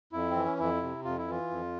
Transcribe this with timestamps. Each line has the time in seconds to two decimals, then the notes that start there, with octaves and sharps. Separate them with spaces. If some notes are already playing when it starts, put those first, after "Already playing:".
0.12 F2 E4
0.30 C4
0.36 E3
0.45 C#4
0.59 F2 E4
0.82 C3
1.04 F2 F4
1.18 E4
1.28 E3 F4
1.51 F2